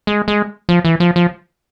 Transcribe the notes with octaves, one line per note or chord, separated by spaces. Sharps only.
G#3
G#3
F3
E3
F3
F3